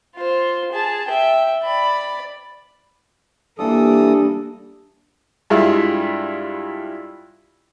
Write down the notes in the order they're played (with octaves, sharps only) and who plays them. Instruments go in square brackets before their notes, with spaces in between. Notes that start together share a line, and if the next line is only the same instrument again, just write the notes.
[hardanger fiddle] F4 C5
G#4 A5
E5 G5
D5 B5
[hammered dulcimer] G2 [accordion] E3 A4 D#6 [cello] A#3
[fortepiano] G2 G#3 E4 F4